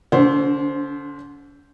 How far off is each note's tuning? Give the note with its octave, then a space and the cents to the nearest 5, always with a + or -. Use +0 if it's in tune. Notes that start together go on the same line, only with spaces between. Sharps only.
D3 -10 C#4 +45 C5 +0